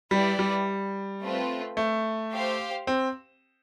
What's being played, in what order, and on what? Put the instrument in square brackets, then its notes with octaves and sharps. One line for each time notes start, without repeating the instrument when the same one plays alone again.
[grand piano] G3 [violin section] E4 G4 B4 D5
[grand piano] G3
[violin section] A3 C4 F4 B4
[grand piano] A3
[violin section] G4 C5 F5
[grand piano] C4